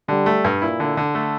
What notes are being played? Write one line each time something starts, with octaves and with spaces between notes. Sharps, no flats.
D3 G3
A3
G2
A#2 E4
D3
D3
A3